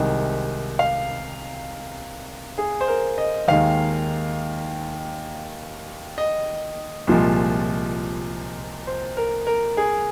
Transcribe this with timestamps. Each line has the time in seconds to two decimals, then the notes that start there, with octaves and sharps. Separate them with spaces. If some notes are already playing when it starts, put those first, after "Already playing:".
Already playing: C2 C3 D#3 G#3
0.79 F5
2.58 G#4
2.81 C5
2.88 A#4
3.18 D#5
3.48 D#2 D#3 G#3 F5
6.18 D#5
7.07 C2 A#2 F3 G#3
8.87 C5
9.17 A#4
9.47 A#4
9.77 G#4